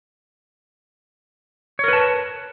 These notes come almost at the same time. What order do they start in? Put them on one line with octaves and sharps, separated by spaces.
C#5 A#4 B4 A5